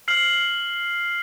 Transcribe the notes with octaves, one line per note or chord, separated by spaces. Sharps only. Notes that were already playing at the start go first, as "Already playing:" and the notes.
F6 C7 F#7